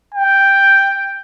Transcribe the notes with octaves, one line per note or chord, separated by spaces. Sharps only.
G5